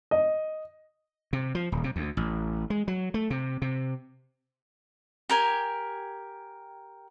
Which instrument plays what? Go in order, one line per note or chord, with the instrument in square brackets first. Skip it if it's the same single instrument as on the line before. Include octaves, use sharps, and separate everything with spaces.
[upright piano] D#5
[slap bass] C3
F3
D#1
C3
D2
A1
G#3
F#3
A3
C3
C3
[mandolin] G4 A#4 G#5